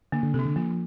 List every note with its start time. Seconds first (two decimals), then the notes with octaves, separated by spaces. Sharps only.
0.12 D3 A#3
0.23 D3
0.34 C3 A4
0.39 D4
0.45 D3
0.56 F3 A#3